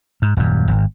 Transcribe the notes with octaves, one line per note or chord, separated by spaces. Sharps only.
G#2
D#1 F#2
G#1